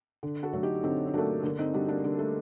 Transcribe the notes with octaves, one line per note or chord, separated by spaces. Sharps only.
D3
F#4 A4
F#3 A3
D#4 G4
D3 C4 D#4
D#4
F#3 A3 A#3 D4
D3 A#3 D4
C4 D#4
G3 D4 F#4
A#3 D4
D3 A#3
A3